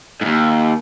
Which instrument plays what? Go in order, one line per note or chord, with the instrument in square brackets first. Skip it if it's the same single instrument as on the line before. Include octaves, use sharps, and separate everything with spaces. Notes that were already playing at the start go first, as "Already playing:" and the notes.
[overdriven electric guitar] D#2 G#2